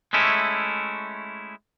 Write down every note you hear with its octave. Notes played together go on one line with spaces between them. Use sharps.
G#3 A3 C#4 E4